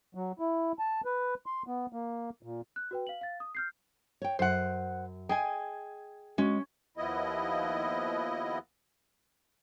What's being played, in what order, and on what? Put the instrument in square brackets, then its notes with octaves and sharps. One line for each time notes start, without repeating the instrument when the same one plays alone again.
[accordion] F#3
E4
A5
B4
C6
B3
A#3
A#2
[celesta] F#6
F#4 B4 G5
F5 F#7
F5 A6
D#6
F6 G6 C7
[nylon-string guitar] C#5 G5
[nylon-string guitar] F#2 [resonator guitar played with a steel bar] C5 F#5
[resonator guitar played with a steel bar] G#4 G#5 [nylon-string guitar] D#5 G5
[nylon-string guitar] G#3 F#4 [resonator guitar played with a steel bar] C#4
[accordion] D#2 F3 B3 E4 D#5